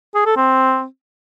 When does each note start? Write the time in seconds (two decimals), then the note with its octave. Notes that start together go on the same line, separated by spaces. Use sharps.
0.15 G#4
0.25 A4
0.36 C4